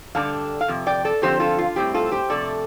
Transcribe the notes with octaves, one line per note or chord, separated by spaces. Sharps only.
G2 D3 G3 D4 F5 A5
F5
F2 C3
D5 G5
A4 D5
D3 F3 C4 G4 C5
F4 A4
F4
A2 G3 C4 G4
F4 A4
G4 C5
F2 C3 A3 D4 A4 D5